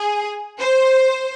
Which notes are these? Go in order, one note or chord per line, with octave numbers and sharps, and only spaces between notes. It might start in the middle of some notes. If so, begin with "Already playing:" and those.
Already playing: G#4
C5